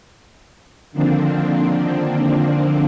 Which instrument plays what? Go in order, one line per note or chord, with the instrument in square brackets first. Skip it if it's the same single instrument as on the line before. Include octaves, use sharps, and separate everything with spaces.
[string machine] D3 D#3 F3 A#3 C4 D4